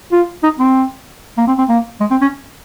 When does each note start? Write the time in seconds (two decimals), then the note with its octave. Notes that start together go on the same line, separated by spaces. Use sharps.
0.12 F4
0.43 D#4
0.59 C4
1.38 A#3
1.47 C4
1.58 C4
1.69 A#3
2.00 G#3
2.11 C4
2.21 C#4